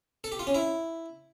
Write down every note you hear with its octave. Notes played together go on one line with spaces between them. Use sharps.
A4
G4
F4
C#4
E4